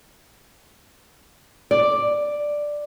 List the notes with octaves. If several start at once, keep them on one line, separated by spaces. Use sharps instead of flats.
D5